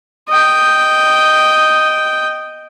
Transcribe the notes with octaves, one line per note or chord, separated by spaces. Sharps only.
D#5 G5